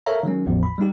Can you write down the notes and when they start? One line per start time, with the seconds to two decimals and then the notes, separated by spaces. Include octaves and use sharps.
0.06 A4 A#4 C#5 E5 F5 A#5
0.23 D#3 F#3 G#3 C#4
0.46 G#1 E2 A2 F3
0.63 B5
0.78 G3 G#3 D#4 G4